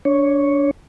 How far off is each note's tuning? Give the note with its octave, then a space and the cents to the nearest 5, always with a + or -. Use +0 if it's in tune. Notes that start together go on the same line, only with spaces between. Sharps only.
D4 -25 C#5 +0